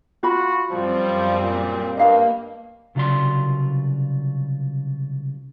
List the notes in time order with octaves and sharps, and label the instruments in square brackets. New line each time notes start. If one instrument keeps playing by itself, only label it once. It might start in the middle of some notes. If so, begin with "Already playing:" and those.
[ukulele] F4 B5 [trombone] F#4
[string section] F#2 G3 C4 [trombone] F3
[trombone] A#2
[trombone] G2 [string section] A#3 [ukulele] D#5 F5
[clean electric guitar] C2 C#3 F#3 F4 D5 C6